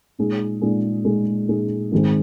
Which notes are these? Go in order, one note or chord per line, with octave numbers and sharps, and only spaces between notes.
A#2 G#3 D#4 G#4
A#2 G#3 D#4 G#4
A#2 G#3 D#4 G#4
A#2 G#3 D#4 G#4
G#2 D#3 G#3 C4